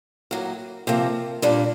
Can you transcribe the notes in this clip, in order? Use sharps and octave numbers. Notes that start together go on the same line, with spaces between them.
A2 F#3 A#3
C3 F3 A#3
A#2 G3 A#3 D4